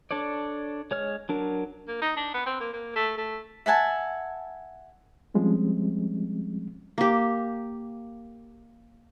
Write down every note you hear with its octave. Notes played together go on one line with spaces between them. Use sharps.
D4 A4 C#5 D5
G#3 C#5 F6
F#3 D4 A#4
A#3
D#4
D4
B3
C4
A#3
A#3
A3
A3
E5 F#5 G#5 A5
F3 G3 G#3 C4 C#4
A#3 G4